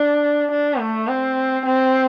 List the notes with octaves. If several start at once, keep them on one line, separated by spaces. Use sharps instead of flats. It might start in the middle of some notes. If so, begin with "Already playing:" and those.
Already playing: D4
D4
A3
C4
C4